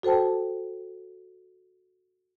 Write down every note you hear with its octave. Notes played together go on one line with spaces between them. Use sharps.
F#4 A4 C5 G5 A5